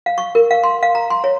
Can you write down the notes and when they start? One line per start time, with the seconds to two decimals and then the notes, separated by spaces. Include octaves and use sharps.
0.06 F5
0.18 C#6
0.35 A#4
0.51 F5
0.64 C6
0.83 F5
0.95 A#5
1.10 C6
1.24 C#5